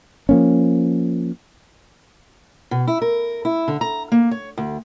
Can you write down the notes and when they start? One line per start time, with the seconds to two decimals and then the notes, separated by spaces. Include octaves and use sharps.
0.29 F3 A#3 C#4
2.71 B2
2.87 E4
3.02 A#4
3.45 E4
3.68 D3
3.81 A#5
4.12 A#3
4.31 C#5
4.58 D2